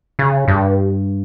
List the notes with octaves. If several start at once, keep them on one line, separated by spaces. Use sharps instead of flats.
C#3
G2